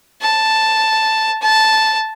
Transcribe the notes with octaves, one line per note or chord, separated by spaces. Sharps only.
A5
A5